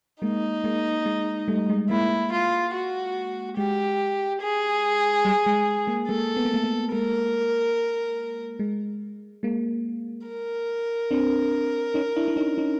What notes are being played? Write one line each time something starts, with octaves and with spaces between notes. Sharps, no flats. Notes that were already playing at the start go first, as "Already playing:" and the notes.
G#3 A#3 D#4
G#3 A#3
G#3
G3 A3
G#3
G#3 A#3 E4
F4
F#4
G#3 G4
G#4
G3
G#3
G#3 A#3
G#3 A#3 A4
B3
A#3
A3 B3
A3 B3
G#3 A#3 A#4
G#3
G#3 A#3
A#4
C4 D4
C#4 D#4
D4 E4
D4
C#4 D#4
C#4 D#4